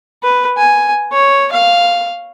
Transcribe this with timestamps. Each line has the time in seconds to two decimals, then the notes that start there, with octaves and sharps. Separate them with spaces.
0.23 B4
0.58 G#5
1.12 C#5
1.52 F5